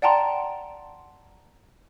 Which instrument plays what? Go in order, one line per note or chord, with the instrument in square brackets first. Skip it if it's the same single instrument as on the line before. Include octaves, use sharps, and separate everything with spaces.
[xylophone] D5 F#5 G5 A5 A#5 C6